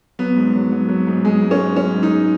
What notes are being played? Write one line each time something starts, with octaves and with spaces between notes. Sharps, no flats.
F#3 B3
G#2
F#3
F#3
F#3
G#2
G#2 G#3
G#2
C#4
G#2
F#3 C#4
G#2
D#4
G#2